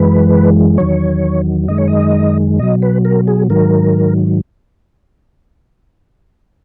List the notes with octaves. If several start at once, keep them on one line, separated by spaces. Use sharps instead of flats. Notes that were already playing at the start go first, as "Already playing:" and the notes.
Already playing: F#2 E3 G#3 B4
E2 D#3 F#3 C#5
F#2 D#3 G#3 D#5
C#5
D#5
B2 F#3 D#5
B4
A#4
G#4
G#2 D#3 F#3 A#4